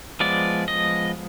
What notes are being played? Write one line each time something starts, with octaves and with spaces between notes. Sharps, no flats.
F3 G#3 B3 D5
D#5